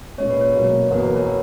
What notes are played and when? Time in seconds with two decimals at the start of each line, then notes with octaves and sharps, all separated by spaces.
0.18 A#2 G#3 C#4 C#5
0.30 B4
0.41 C#5
0.55 B1 B2 A#3
0.91 E2 B2 A#3 A#4
1.04 B4
1.16 C#5